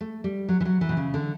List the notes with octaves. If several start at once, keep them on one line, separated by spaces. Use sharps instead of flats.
A3
G3
F#3
E3
F#3
E3
B2
C#3
D3